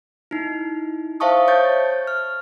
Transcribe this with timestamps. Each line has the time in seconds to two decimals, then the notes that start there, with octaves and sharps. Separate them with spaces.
0.31 D#4 E4
1.20 C5 E5 F5 A5 C#6 D#6
1.47 C5 C#5 C#6 G6 A6
2.07 F6